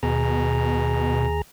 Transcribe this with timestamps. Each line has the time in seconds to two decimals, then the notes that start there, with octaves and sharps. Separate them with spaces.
0.03 D#2 B2 G#4 A#5